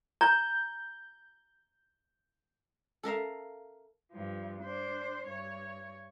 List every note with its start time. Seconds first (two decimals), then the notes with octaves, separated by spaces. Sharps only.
0.21 A#5 G6
3.03 A4 A#4 E5 F5
4.12 G2 F3
4.62 D4 C5
5.27 G2 C#5